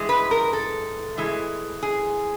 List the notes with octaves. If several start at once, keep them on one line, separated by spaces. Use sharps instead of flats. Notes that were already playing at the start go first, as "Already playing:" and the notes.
Already playing: G2 E3 G#3
B4
A#4
A4
A2 E3 G#3
G#4